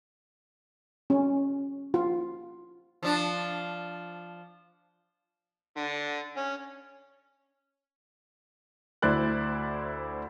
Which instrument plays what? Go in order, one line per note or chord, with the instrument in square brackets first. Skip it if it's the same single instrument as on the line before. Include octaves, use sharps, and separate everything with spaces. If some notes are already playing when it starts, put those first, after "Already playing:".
[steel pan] C#4
F4
[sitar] F3 D4
[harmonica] D3
C#4
[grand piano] D2 E4 C5 D5 F#6